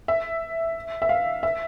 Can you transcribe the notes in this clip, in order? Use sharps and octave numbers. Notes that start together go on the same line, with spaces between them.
E5
E5
F5
E5